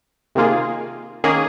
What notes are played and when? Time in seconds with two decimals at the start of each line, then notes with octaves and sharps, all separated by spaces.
0.35 C3 D#3 A#3 F4 G#4
1.24 D#3 A#3 C#4 G#4